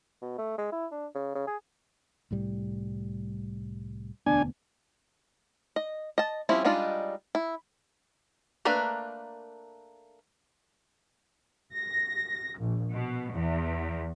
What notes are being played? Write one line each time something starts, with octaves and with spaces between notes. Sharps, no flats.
B2
A3
G#3
E4
D4
C#3
C#3
G#4
C2 A2 G3
E1 D2 B3 D4 G#5
D#5
D#5 A5
F3 G3 C4 C#4 E4
G3 G#3 D4 D#4 F4
E4
A3 A#3 D4 A#4 B4
A#6
A#1
B2
E2